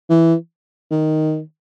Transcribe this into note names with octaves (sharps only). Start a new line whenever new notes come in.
E3
D#3